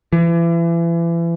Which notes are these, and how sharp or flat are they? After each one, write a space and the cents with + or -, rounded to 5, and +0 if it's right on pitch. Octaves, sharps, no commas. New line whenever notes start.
E3 +35